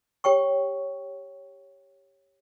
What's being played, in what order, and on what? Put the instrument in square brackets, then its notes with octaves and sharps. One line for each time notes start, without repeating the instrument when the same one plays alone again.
[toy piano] G4 C#5 G5 C#6